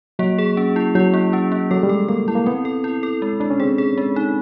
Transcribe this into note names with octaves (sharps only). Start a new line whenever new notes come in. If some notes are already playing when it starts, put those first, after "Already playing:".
F#3 A#3
G#4
C#4
E4
F#3 E4
A#3
C#4
A#3
F#3 A4
G3
G#3 A4
A#3 A4
E4
A#3
B3 C4
A4
E4
A4
G#3
G#3 D4
C#4
C4 G#4
G#4
G#3
D#4